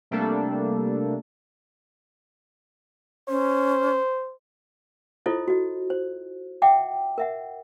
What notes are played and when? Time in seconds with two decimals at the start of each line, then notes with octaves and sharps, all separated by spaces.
0.11 C3 G3 A3 A#3 D4 A4
3.29 C#4 C5
5.26 E4 F4 A4 C5 D#5
5.48 F#4 D#5
5.90 C5
6.62 E5 F#5 G5 D6
7.18 A#4 E5 F#5